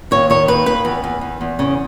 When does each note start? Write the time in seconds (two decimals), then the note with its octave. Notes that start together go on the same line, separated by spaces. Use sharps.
0.11 D#2 C#5
0.30 D#3 C#5
0.48 D#2 B4
0.66 D#2 B4
0.85 E2
1.04 E2
1.21 E2
1.41 E2
1.59 C#3